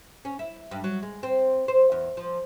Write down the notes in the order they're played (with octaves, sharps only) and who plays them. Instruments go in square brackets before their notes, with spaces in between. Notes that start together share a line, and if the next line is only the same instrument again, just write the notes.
[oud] C#4
E4
G2
F#3
G#3
C4
C5
E2
F3